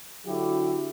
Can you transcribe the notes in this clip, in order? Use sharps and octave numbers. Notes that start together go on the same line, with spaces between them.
D3 F#3 E4 F#4 G4 A4